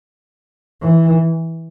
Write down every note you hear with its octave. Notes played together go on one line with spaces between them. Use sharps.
E3